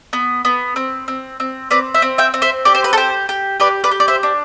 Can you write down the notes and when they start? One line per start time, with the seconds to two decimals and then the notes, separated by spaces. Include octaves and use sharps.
0.13 B3
0.45 B3
0.76 C4
1.08 C4
1.40 C4
1.71 C4 B4 D5
1.94 C5 E5
2.02 C4
2.18 E5 G5
2.34 C4
2.42 C5 E5
2.65 G4 D5
2.75 C5
2.84 B4
2.93 G4 A4 C5
3.29 G4
3.60 G4 B4 D5
3.84 B4 D5
3.91 G4
4.00 D5
4.08 C5 E5
4.23 D4